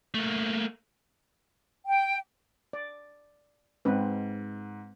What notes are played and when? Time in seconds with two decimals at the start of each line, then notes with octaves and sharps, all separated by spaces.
0.14 A3 A#3
1.86 G5
2.73 D5
3.85 G#2 G#3 C4 B4